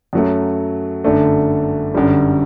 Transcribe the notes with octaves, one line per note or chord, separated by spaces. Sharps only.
F#2 F#3 A3
G1 F#2 D3 A3 D4
G1 F#2 D3 G3